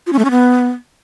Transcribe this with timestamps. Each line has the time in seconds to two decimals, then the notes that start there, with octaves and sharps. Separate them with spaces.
0.07 F4
0.13 C#4
0.19 A3
0.25 C#4
0.31 B3